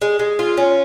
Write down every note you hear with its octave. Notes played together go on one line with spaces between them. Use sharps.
G#3
G#3
F4
C#4